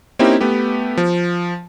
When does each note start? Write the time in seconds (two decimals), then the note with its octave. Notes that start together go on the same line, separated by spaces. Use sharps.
0.19 A#3 C4 C#4 D#4 E4 G4
0.41 A3 B3 G4
0.97 F3